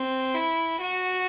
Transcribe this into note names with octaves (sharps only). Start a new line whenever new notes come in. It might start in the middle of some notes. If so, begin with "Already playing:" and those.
Already playing: C4
E4
F#4